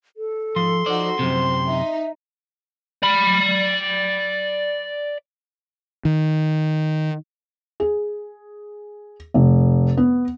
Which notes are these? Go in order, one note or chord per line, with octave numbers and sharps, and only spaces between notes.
A4
G#2 F3 C6
F3 D#4 F#4 C5 D5
F#2 A2 C3 C4
D#4 E5
D5 B5
D#3
G#4
F1
B3